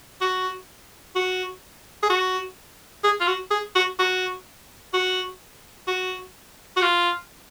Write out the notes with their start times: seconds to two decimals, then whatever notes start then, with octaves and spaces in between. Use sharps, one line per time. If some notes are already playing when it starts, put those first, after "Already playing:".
0.21 F#4
1.15 F#4
2.03 G#4
2.10 F#4
3.04 G#4
3.20 F4
3.28 F#4
3.51 G#4
3.75 F#4
3.99 F#4
4.93 F#4
5.88 F#4
6.77 F#4
6.82 F4